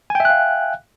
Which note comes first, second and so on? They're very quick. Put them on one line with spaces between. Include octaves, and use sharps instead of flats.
G#5 G5 E5 F#6 F5